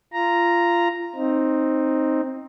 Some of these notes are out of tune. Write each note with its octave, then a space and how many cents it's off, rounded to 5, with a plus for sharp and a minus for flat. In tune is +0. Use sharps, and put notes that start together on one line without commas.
F4 -20 A#5 +0
C4 +10 D#4 +0